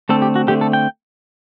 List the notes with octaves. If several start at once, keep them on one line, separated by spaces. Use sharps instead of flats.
D3 A3 C4 A4
G4
F#4
D3 A3 C4 G4
A4
G5